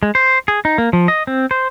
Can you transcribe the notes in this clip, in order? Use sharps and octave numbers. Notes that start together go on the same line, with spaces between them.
G#3
C5
G#4
D#4
A#3
F3
D#5
C4
C5